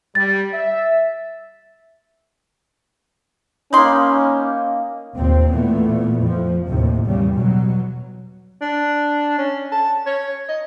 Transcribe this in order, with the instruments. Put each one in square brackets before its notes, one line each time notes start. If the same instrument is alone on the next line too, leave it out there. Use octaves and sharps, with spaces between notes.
[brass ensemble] G3 [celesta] A6
[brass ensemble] E5
[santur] A#3 D#4 [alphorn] C#4 [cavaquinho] B5 C6
[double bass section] D#2 A#2 C4
A#2 E3 A3 B3
F2 F3
D#2 A2 C3
E2 C#3 G3
B2 F#3
[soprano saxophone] D4
C#4
A5
C#5
D#5